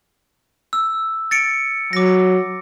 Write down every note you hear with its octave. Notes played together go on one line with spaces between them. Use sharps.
E6
A6 C#7 D7
F#3 D6 A#6